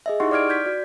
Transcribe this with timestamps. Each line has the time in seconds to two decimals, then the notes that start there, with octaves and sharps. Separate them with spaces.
0.06 G#4 D#5 E5
0.20 D#4 E4 G4 F#5 C6 C#6
0.31 D5 D6 F6 G#6 D7
0.49 G6 G#6 B6
0.66 F#4 D5